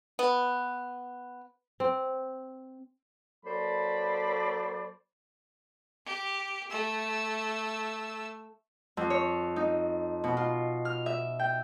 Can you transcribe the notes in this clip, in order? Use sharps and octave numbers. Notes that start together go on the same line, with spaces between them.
B3
C4
F#3 A#3 A4 C5 D5 B5
G4
A3 E6
F2
C#5
D#4
B2
F4
F6
E5
G5